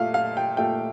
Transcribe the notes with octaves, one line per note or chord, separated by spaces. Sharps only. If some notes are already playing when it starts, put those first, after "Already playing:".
Already playing: A#2 A3 F5
F5
G5
A#2 A3 G5